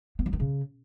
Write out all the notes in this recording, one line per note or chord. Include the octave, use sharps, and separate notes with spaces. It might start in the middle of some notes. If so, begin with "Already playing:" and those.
B3
F#3
D#3
C#3